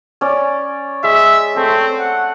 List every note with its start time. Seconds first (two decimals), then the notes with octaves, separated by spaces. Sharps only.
0.21 C#4 D5
1.04 G#3 E5
1.56 A3 C4
1.99 F#5